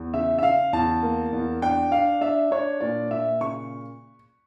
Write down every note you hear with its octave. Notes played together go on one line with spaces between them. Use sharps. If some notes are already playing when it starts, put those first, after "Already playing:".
Already playing: E2
C#3 E5
E5
C#3 F5
E2 A5
A#3
E2
D4 G5
D4 F5
D4 E5
D4 C#5
A#2 D5
A#2 E5
C#3 C#6